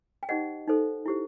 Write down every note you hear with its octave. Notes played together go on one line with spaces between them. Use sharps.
G5
D#4 G4 C5 D#5 F#5
D#4 A4 C5
E4 G4 C5